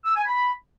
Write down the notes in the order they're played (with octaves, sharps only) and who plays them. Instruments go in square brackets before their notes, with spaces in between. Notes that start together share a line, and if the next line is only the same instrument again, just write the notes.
[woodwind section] E6
G#5
B5